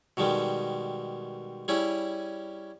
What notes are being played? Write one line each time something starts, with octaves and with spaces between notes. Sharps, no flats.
B2 D#3 G3 G#3
G3 C#4 E4 G#4